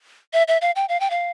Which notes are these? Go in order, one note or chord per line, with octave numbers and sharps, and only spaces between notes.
E5
E5
F5
G5
F5
G5
F5